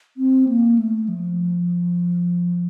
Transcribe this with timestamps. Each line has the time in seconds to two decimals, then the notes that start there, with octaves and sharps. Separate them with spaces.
0.17 C4
0.48 A#3
0.78 A3
1.08 F3